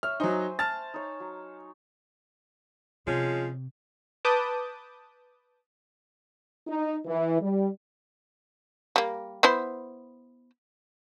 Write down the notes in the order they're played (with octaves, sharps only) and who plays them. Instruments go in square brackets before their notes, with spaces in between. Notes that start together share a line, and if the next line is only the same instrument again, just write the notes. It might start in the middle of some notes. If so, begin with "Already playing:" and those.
[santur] C#5 E5 [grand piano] F6
[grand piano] F#3 D#4 [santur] C5 G#5
[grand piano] A5 F6 A6
[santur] D#4 C#5
F#3
[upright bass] C3 [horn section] F3 G#3 C#4
[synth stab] B4 A5 D6 D#6 G6
[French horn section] D#4
E3
G3
[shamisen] G3 A#3
B3 E4 C5